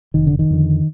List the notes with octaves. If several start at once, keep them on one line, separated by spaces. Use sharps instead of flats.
F1 D#3
D3
D#3
F2 D3